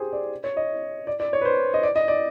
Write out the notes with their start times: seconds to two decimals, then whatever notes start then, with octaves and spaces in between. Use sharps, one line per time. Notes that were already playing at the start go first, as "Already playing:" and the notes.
Already playing: G4 G#4 C5
0.13 D5
0.44 C#5
0.57 D#5
1.07 D5
1.20 D5
1.33 C#5
1.41 B4
1.45 C5
1.74 D#5
1.83 D5
1.96 D#5
2.08 D5